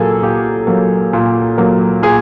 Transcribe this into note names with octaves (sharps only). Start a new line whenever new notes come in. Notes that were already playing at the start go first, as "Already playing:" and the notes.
Already playing: A#2 F#3 A#3 G#4 A4
A#2 G4
F#3 A#3
A#2
F#3 A#3
A#2 G#4